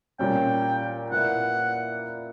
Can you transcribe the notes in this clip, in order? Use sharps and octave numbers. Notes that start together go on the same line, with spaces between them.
A#2 G3 C#4 G5
A#2 A#3 E4 B4 D5 F#5